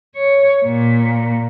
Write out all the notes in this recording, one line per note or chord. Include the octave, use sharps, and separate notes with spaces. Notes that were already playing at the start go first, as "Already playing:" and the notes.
C#5
A#2